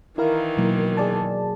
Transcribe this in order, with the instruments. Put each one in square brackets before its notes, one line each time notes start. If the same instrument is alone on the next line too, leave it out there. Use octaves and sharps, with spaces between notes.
[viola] D#3 E3 [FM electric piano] E4 A#4 F5
[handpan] B2 F#3 A#3
[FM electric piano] G#4 D5 A5